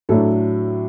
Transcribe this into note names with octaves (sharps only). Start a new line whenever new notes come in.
A2 F#3 A3 D4 A4